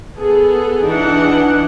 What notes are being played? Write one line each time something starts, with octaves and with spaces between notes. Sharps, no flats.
B3 G#4 A4
E3 D4 D#4 F#5